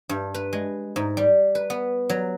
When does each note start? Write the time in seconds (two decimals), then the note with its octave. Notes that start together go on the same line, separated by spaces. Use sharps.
0.09 G2
0.34 B4
0.53 G#3
0.96 G#2
1.17 G3
1.55 B4
1.70 B3
2.09 F#3